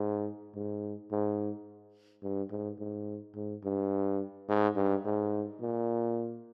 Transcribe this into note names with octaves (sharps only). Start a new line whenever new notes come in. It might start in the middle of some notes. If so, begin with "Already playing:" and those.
Already playing: G#2
G#2
G#2
G2
G#2
G#2
G#2
G2
G#2
G2
G#2
A#2